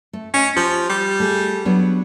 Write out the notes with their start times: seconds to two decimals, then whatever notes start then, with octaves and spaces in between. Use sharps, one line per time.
0.13 A3
0.34 C#4 D#5
0.56 F3 G4
0.89 G3
1.20 A3 G#4
1.65 F#3 B3 D4